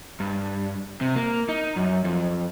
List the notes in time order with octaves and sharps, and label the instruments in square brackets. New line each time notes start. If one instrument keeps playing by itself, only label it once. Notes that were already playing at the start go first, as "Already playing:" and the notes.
[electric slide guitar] G2
C3
A#3
D#4
F#2
F2